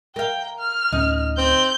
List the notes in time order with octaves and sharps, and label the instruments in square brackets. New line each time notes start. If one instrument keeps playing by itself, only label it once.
[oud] A#4 F5 [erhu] G5
[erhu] F6
[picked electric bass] D2 A2 C#4 [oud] D#4
[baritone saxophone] C4 [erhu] G6